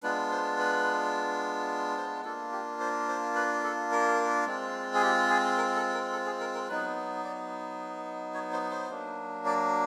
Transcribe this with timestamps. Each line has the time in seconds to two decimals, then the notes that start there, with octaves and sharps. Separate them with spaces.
0.03 G#3 B3 D4 F4 B4
0.31 C5
0.59 B4
1.97 C5
2.24 A#3 D4 F4 A4
2.52 G4
2.80 C5
3.09 C5
3.35 B4
3.64 A4
3.92 A#4
4.47 G#3 C4 F4
4.95 G#4
5.02 G4
5.30 G#4
5.58 A#4
5.76 A4
5.94 A#4
6.13 A4
6.26 G#4
6.40 A#4
6.54 A#4
6.68 F#3 B3 D#4 B4
7.24 D5
8.34 C#5
8.52 C5
8.71 C5
8.90 F#3 A#3 D4
9.46 D5